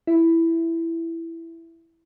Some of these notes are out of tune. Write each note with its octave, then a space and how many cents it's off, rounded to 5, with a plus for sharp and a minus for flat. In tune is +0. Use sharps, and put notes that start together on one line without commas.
E4 +5